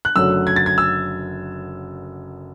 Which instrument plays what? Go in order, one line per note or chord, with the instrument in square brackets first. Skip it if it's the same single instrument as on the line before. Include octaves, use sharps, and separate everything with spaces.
[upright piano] F#6
[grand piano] F#1 F#2 D3 F#3 A3 [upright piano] E6
[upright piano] G#6
A6
G#6
E6